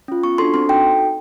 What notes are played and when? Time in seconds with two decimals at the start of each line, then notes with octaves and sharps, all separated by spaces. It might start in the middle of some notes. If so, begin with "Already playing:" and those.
0.08 C#4 F4
0.23 B3 C#6
0.38 D4 F#4 A4 C6
0.54 C4 C6
0.69 D#4 F#4 A4 G5